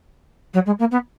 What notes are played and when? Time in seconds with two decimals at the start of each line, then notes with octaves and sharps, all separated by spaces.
0.54 F#3
0.66 G#3
0.79 A#3
0.91 B3